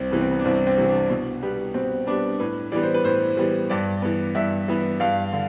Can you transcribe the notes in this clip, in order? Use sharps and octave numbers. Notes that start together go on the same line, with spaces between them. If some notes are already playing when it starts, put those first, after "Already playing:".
Already playing: C2 C4
C3 E3 B3
C4
B3
D4
C2 C4
C4
C3 E3
D4
B2
G3 B3
B2 C4
G3 B3 D4
A2 B4
E3 G3 B3 D5
C5
B4
A2 C5
E3 G3 B3
G2 D5
E3 B3
G2 E5
E3 B3
G2 F5
D3